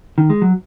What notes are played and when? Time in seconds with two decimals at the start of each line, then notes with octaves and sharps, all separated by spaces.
0.18 D#3
0.30 G#3
0.42 F#3